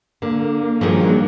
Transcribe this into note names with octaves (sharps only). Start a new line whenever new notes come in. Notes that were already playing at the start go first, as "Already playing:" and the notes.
D3 A#3
G2 D#3 F3 F#3 D#4 G#4